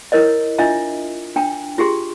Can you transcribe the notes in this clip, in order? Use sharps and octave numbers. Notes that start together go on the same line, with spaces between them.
E4 A#4 C#5 D#5
D4 F4 D#5 E5 A#5
D4 G5 A#5
F4 G4 G#4 C6